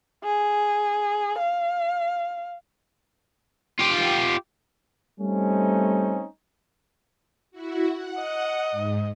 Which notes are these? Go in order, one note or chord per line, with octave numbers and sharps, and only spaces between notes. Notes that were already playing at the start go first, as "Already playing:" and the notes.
G#4
F5
F4 G4
G3 A3 C4 C#4 D#4
E4 F#4
F#5
D#5
G#2